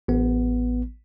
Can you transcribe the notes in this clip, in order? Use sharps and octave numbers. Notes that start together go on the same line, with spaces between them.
A1 B3